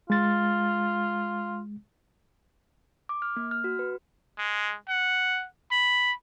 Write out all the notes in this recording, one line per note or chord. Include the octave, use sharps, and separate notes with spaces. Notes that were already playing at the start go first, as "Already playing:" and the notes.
G#3 F4 A6
D6
F6
A#3
F6
F#4
B4
G#3
F#5
B5